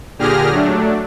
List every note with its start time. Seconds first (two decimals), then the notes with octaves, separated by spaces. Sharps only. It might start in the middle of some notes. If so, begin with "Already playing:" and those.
0.19 A#2 D3 G4 G#4 F6 A#6
0.51 F#3 A3 D4